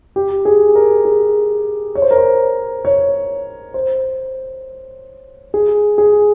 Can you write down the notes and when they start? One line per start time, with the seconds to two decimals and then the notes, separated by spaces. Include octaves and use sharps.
0.16 G4
0.45 G#4
0.75 A#4
1.05 G#4
1.95 C#5
2.02 C5
2.11 A#4
2.18 C5
2.85 C#5
3.74 C5
5.54 G#4
5.98 G#4